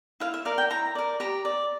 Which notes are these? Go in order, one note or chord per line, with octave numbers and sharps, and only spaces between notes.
E4 F5
E5
A#4 D5 F5
G5
E4 A#5
A#4 D5
G4 A#5
D5